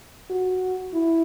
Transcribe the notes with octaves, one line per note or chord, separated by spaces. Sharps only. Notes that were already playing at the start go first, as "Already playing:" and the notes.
F#4
E4